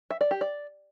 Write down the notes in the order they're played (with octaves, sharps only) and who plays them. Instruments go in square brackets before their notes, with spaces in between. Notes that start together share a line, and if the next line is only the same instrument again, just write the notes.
[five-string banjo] E5
D5
G4
D5